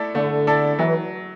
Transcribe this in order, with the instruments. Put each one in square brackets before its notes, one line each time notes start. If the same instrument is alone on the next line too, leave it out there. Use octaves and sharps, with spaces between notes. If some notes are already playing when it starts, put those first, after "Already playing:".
Already playing: [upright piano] A3 E4 A4 D5
[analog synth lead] D3 [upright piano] A3
[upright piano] E4 A4 D5
[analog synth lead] E3 [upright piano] F#3